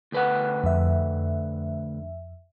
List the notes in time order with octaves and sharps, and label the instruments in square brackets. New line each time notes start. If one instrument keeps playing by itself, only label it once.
[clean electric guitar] D2 B4 F#5
[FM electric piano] F2 E5